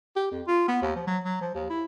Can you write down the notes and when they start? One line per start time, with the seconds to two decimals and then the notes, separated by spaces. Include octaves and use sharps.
0.16 G4
0.32 F2
0.47 F4
0.68 B3
0.82 D#2
0.96 F3
1.07 F#3
1.24 F#3
1.41 F3
1.55 D#2
1.70 E4